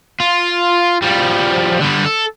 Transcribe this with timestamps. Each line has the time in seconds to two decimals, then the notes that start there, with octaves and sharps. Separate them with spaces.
0.20 F4
1.02 F3 G3
1.81 D3 G3
2.05 A4